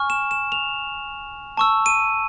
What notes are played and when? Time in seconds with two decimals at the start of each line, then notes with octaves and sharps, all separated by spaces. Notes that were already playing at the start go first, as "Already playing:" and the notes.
Already playing: G#5 C#6 F6
0.10 E7
0.31 E7
0.52 F7
1.57 A5 C#6 E6
1.86 D#7